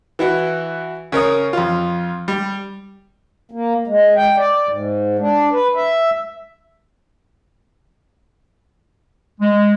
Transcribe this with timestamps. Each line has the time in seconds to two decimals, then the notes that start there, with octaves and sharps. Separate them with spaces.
0.19 E3 E4 F#4
1.12 C#3 A#4 C#5 D#6
1.53 F2 F4
2.28 G3
3.51 A#3
3.87 G#3
4.16 G5
4.37 D5
4.68 G#2
5.19 D4
5.52 B4
5.75 E5
9.41 G#3